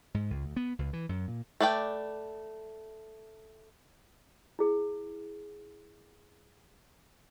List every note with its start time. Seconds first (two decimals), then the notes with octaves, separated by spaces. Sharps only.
0.14 G#2
0.30 C#2
0.45 D2
0.56 B3
0.79 C#2
0.93 E3
1.09 F#2
1.28 A#2
1.60 A3 B4 D5 G5
4.59 E4 G#4